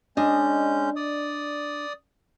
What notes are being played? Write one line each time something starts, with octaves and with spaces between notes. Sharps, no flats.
G#3 C#4 D4 D#5 G6
D5 D#6